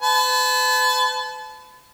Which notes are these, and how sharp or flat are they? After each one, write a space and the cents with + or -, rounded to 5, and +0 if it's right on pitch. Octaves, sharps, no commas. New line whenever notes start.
B4 +40 A5 -30